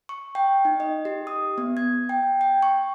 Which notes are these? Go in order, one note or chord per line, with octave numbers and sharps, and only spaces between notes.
C#6
G5
D#4
D#5
G4
D#6
B3
G#6
G5
G5
C#6